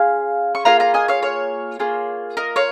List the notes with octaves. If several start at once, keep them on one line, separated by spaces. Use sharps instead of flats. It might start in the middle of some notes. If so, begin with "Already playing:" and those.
Already playing: C#4 F4 G#4 F5
C#6
A#3 F4 G#4 F5 A#5
F5 A#5
D#5 G#5
C#5 F5
C#5
A#3 F4 G#4
A#4 D#5
C#5 F5